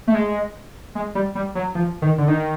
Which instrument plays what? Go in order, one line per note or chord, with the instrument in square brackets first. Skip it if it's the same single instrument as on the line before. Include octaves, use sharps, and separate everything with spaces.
[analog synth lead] A3
G#3
G#3
G3
G3
F#3
F3
D#3
D3
D#3